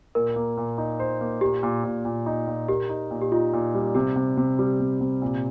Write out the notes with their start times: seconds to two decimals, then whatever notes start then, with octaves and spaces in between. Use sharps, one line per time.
0.15 A#2 A#4
0.36 A#3
0.57 A#2
0.78 D#4
1.00 C5
1.21 A#3
1.41 A#2 G4
1.63 A#2
1.84 A#2
2.05 A#2
2.26 D#4
2.48 A#2
2.69 G4 A#4
2.89 D#4
3.11 A#2
3.21 G4
3.32 D#4 F4
3.53 A#2
3.75 G3
3.95 C3 G4
4.16 C3
4.37 C3
4.59 G3
4.80 C3
5.01 C3
5.22 A#2